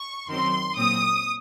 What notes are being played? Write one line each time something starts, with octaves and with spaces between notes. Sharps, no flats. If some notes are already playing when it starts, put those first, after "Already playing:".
Already playing: C#6
F#2 D#3 F#3 C4 C6
A#2 F#3 C4 D#6